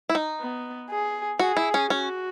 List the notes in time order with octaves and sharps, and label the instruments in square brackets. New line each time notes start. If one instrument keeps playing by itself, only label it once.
[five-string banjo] E4
D#4
[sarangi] B3
G#4
[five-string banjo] F#4 [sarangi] G#4
[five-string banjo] E4
C#4
[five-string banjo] C#4 [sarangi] F#4